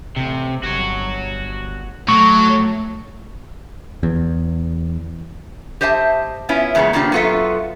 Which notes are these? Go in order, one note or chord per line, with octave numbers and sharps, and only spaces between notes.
A1 C3
G1 F#4 C#5
A2 F#3 A3 C#6
E2
G4 C5 D#5 E5 G#5 A5
B3 C#4 E4 F4
E2 A#2 C#3 G#3 B3
C#3 A#3 C4 D4 F4 G4
F#2 B3 F4 F#4 A4 E5